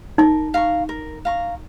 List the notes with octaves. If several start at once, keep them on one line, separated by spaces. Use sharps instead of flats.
D#4 A#4
F5 A#5 C#6
A#4
F5 A#5 C#6